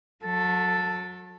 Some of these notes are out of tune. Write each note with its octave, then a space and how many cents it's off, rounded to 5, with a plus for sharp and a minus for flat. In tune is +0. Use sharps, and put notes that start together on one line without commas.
F#3 -35 A4 +0